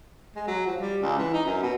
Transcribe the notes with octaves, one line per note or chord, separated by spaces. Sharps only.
G#3
F#3
F3
G3
C#2
E3
D#4
F#2
B2